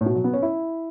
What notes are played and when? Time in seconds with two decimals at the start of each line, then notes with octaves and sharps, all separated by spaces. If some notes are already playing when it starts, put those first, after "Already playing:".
0.01 A2
0.06 B2
0.15 F#3
0.24 B3
0.34 C#4
0.43 E4